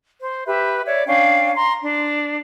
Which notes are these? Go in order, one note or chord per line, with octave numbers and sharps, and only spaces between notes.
C5
G4 B4 E5
C#5 D5 E5
C#4 D4 F5 G5
A#5 C6
D4